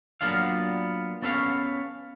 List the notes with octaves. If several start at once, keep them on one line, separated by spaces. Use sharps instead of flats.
F#3 A#3 B3 D4 F4 F5
B3 C#4 A4 B4 C#5 F5